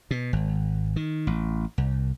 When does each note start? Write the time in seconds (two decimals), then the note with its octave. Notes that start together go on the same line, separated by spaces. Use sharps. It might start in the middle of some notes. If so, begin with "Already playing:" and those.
0.11 B2
0.33 G#1
0.96 D#3
1.27 A1
1.78 C2